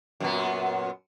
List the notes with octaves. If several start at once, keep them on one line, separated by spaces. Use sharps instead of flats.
F#2 A#2 B3